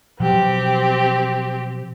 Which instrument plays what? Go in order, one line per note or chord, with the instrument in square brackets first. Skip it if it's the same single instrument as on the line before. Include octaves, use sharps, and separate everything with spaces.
[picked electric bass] B2 F3 F#3 [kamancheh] C4 G4